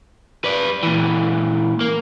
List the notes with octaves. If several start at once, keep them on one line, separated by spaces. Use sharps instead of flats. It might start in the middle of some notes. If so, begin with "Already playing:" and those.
B4 D5
A#2 E3
A#3